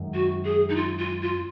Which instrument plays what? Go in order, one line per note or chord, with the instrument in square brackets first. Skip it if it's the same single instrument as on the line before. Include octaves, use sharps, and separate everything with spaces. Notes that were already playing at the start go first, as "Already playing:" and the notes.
Already playing: [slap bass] F#2 D#3 G#3
[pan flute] F#4
G#4
D#4
F4
F4
F4